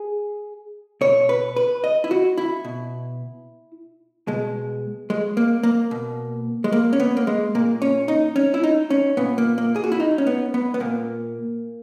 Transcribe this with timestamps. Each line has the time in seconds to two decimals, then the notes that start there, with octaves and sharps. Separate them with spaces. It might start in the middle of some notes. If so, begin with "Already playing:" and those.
Already playing: G#4
1.01 B2 C#5
1.29 B4
1.56 B4
1.84 D#5
2.04 E4
2.11 F#4
2.38 E4
2.64 B2
4.28 B2 G#3
5.10 G#3
5.37 A#3
5.63 A#3
5.91 B2
6.64 G#3
6.72 A#3
6.93 C#4
7.00 B3
7.17 A#3
7.27 G#3
7.55 A#2 A#3
7.82 C#4
8.08 D#4
8.36 C#4
8.54 E4
8.63 D#4
8.90 C#4
9.17 A#2 B3
9.38 A#3
9.58 A#3
9.76 G#4
9.84 F#4
9.92 E4
10.00 D#4
10.18 C#4
10.27 B3
10.54 B3
10.74 B3
10.80 A#2 A#3